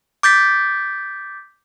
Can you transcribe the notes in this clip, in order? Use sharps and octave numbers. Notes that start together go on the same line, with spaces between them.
D6 G6 A6 B6